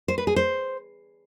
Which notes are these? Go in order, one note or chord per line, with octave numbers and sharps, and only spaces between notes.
C5
B4
G#4
C5